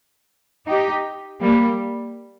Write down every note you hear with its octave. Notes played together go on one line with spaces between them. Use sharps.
D#4 G4
G3 A#3